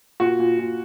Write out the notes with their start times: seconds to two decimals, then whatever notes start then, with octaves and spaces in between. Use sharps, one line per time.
0.20 A#2 F#4
0.39 A#2
0.58 A#2